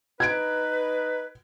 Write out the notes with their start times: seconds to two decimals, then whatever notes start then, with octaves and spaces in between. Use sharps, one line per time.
0.20 D#4 B4 G#6 D7